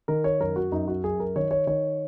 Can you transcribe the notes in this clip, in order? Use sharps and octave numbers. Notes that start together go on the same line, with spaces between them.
D#3 A#4
C#5
F#2 A#4
F#4
F#2 D#4
F#4
F#2 G#4
A#4
D#3 C#5
C#5
D#3 C#5